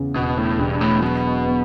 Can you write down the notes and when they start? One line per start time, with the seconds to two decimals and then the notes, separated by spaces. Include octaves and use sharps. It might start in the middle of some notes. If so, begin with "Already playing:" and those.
Already playing: E2 C#3
0.15 E1 B2
0.37 A2
0.59 E1 G2
0.81 A2
1.02 B2 F#3
1.45 B3